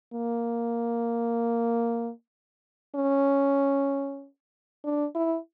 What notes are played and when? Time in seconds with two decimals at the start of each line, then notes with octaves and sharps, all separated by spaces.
0.13 A#3
2.95 C#4
4.84 D4
5.15 E4